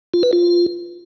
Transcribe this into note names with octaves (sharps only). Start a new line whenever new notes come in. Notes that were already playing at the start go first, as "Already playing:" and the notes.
F4
B4
F4